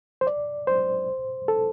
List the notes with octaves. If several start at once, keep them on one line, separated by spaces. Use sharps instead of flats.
C5
D5
C5
A4